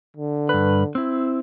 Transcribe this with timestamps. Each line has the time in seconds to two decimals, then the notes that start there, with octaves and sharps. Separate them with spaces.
0.17 D3
0.49 G2 B4
0.95 C4 E4